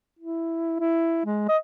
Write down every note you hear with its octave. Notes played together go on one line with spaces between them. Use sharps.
E4
E4
G#3
D#5